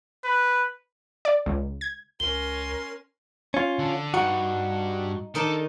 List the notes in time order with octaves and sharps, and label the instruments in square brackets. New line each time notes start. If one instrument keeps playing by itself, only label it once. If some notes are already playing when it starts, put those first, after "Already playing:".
[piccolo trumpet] B4
[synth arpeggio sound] D5
C#2
G#6
[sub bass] C#2 [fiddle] C#4 C6 [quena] A#4 [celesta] G7
[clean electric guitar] C#4 F4
[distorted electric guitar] D3
[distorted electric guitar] G2 [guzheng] D#4 [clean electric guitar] F#4
[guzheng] D#3 D#4 D5 [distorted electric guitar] A4